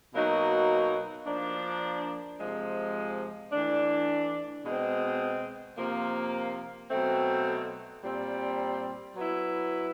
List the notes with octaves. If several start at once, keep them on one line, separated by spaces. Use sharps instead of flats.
B2 F#3 A#3 D#4 F#4
F3 A#3 D4
C3 F3 G#3
E3 A3 D4
B2 G#3 C4
C3 F3 A#3
B2 F#3 A3 C4
A#2 G3 C4
F#3 B3 E4